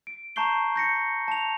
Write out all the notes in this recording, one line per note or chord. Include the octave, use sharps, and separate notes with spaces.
D7
A5 A#5 C#6 G6 C7 G7
G6 A#6 C#7
A5 F7